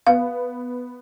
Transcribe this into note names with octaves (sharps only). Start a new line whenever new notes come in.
B3 F5